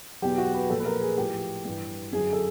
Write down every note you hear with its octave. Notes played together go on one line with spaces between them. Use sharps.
E2 B2 F#3 G4
F#4
B4
A#2 F3 A4
B4
A#4
G#4
A2 F3 G4
G2 E3
F#2 D3 F#3 G#4
A4